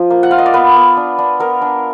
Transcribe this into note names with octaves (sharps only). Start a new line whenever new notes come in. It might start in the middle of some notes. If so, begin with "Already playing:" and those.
Already playing: F3
A#3
F#5
F4 F5
D#5
D5
B3 B4
B3
D4
D4
B3 A#4
D4